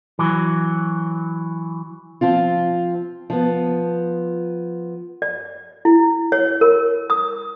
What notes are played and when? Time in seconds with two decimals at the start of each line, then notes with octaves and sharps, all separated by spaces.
0.19 E3 F#3
2.21 F3 C4 F4
3.30 F3 B3
5.22 D5
5.85 E4
6.32 C#5
6.61 A#4
7.10 D#6